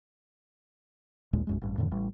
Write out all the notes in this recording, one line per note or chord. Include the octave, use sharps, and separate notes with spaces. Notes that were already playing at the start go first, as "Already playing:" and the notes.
A1 D#2 A#2 G#3
B1 F#2 G#3
A1 G2
F2 A2 D3 E3
A1 A2 G3